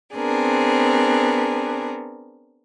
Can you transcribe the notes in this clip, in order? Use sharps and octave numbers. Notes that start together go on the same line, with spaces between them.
B3 C4 D4 G#4 A#4